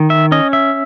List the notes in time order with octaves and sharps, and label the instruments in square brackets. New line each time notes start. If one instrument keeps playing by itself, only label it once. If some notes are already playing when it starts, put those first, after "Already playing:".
Already playing: [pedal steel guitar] D#3
E5
C#4 D#5
E5